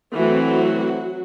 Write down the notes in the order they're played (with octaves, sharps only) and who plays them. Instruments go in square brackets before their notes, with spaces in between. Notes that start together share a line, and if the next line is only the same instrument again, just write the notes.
[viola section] E3 F#3 A3 C4 F#4